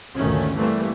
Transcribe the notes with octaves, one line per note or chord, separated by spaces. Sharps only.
G1 D2 A#2 D#3 A3 C#4
E3 G3 A3 A#3 C4